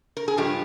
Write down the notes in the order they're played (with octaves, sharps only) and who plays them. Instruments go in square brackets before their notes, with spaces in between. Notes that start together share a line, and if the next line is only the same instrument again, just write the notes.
[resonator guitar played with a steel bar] A#4
G#4
G2 F3 G#3 G4